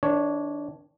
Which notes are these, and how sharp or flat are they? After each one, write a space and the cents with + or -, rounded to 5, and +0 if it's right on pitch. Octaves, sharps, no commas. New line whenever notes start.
D#3 +40 D4 -10 C#5 +0